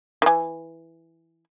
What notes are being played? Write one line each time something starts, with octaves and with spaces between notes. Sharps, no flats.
D#3 E3